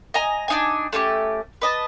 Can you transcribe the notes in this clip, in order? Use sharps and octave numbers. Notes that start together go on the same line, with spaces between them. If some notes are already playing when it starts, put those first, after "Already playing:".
D#5 G#5 A#5
D4 D#4 G#5
A3 C#4 F4 G4
B4 D#5 A5